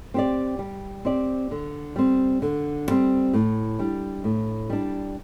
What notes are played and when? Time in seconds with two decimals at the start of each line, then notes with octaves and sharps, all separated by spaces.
0.14 C4 G4 D5
0.59 G3
1.05 C4 G4 D5
1.51 D3
1.96 G3 C4
2.42 D3
2.88 G3 C4
3.33 A2
3.79 G3 D4
4.24 A2
4.70 G3 D4